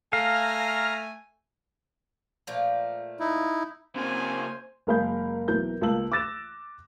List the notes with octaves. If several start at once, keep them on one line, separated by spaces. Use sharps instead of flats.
A3 F5 G#5 A#5 F6
A#2 F3 A3
D#4 E4
C#3 A#3 C4 C5 G#5
F#1 G#3 A#4 F5 B5 G6
B1 E3 A#4 G6
C#2 A#3 A5 E6 F#7
D6 E6 F#6 A6 A#6 E7